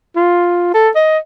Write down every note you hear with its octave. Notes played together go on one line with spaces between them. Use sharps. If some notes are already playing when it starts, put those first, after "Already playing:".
F4
A4
D#5